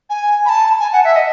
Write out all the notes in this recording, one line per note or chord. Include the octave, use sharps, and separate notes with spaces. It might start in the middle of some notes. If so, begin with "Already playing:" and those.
G#5
B5
A5
G#5
F#5
E5
D#5